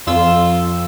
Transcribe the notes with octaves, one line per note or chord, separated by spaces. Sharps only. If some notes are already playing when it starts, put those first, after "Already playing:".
F2 F4 E6